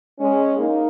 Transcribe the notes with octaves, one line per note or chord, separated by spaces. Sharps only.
G#3 C#4
A#3 D#4